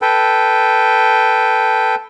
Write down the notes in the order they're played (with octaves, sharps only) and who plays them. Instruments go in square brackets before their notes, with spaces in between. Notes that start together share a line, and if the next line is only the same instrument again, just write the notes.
[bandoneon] A4 B4 G5